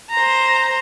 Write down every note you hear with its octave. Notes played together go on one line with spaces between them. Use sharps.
C5 A#5